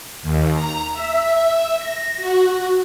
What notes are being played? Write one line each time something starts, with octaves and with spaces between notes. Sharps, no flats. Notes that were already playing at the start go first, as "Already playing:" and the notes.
D#2
A#5
E5
A#6
F#4